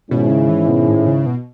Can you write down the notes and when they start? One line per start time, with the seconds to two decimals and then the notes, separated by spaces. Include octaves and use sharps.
0.11 G#2 B2 D#3 G#3 C#4 E4
0.30 C#3
0.49 E3
0.68 B2
0.88 A2
1.07 C#3
1.26 B2